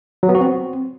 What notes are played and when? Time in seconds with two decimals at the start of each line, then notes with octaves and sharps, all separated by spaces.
0.23 F#3
0.29 B3
0.35 F#4
0.41 C4